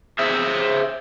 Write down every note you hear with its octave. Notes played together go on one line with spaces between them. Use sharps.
G#4 C5 E5